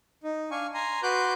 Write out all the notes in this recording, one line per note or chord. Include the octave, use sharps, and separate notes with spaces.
D#4
D4 F5 G#5 C#6
G#5 A#5 C6
F#4 B4 C6 D6 F#6 G6